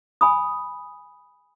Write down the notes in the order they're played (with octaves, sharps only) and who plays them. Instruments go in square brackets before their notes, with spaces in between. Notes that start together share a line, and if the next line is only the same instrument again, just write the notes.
[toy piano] G#5 B5 D#6